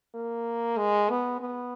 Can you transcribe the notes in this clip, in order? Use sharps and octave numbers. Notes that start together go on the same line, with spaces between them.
A#3
G#3
B3
B3